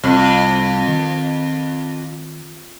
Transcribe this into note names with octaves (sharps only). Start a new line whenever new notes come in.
C2 F2
D#3